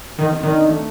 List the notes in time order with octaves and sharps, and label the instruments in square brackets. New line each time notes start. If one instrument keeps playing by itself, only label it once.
[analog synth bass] D#3 [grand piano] D#4
[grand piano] C4
[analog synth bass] D#3 [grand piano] D4
[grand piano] A3